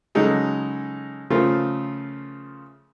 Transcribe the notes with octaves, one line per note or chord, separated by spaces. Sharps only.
C#3 F#3 G#3 D#4 A4
C#3 F3 A3 F4 A#4